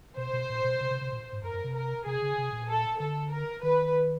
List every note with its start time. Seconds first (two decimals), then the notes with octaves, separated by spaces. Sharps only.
0.17 B2 C5
0.33 B2
0.49 A#2
0.64 B2
0.81 C3
0.91 C3
1.01 C3
1.12 A#2
1.33 G#2
1.43 F#2 A#4
1.54 F#2
1.64 C3
1.75 A#4
2.06 C3 G#4
2.22 C#3
2.38 C3
2.53 A#2
2.69 A4
3.00 D3 A4
3.32 A#4
3.63 D#3 B4